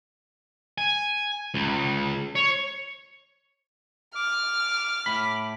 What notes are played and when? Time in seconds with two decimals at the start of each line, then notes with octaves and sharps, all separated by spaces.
0.78 G#5
1.54 C#2
2.35 C#5
4.15 D6 F6
5.06 A2 B5